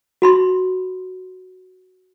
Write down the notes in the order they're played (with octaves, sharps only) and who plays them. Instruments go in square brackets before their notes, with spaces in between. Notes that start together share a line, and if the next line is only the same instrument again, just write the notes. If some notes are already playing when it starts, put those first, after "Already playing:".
[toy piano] F#4 B5 C6